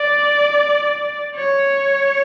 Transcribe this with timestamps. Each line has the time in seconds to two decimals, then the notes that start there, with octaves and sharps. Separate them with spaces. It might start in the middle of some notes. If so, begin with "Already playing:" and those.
Already playing: D5
1.36 C#5